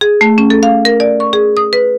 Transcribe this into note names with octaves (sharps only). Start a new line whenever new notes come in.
G#4
A3
C#4
A4
F5
A#4
D5
C#6
G#4
D#6
B4